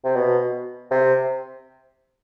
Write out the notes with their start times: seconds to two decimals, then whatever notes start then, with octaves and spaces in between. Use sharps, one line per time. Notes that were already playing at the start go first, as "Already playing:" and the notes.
0.04 C3
0.16 B2
0.91 C3